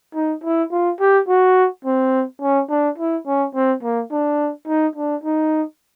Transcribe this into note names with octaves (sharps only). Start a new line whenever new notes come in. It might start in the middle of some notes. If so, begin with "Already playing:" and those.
D#4
E4
F4
G4
F#4
C4
C#4
D4
E4
C#4
C4
A#3
D4
D#4
D4
D#4